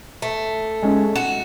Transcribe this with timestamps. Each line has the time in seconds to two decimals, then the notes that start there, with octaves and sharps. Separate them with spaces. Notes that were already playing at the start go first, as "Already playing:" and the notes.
0.22 A3
0.82 G#3 C#4
1.16 F#4 E7